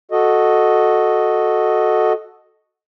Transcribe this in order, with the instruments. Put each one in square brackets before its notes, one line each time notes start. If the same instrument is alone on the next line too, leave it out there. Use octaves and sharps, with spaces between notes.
[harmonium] F#4 A4 D#5